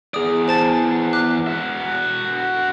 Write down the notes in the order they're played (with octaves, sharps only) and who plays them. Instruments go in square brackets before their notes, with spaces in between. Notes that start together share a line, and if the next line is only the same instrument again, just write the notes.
[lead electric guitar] E2 D5 [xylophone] G#4 D#6
[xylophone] C5 A5 A6
D6 F#6
[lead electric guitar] F#4 E5